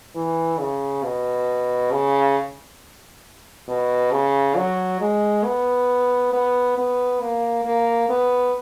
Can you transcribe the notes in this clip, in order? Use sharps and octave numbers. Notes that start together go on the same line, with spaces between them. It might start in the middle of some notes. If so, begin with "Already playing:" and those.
E3
C#3
B2
C#3
B2
C#3
F#3
G#3
B3
B3
B3
A#3
A#3
B3